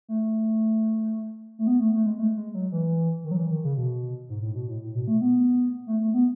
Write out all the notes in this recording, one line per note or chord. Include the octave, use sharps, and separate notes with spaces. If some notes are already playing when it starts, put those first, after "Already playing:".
A3
A3
B3
A3
A3
G#3
A3
G#3
F#3
E3
D#3
F#3
E3
D#3
C#3
B2
G#2
A2
B2
A2
A2
B2
A3
B3
A3
A3
B3